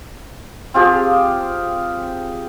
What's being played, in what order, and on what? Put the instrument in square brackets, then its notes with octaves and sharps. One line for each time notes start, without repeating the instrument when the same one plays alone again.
[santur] C4 F4 G4 G#4